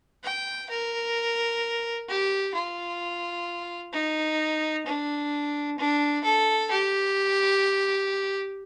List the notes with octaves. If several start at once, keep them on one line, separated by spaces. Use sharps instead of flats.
G5
A#4
G4
F4
D#4
D4
D4
A4
G4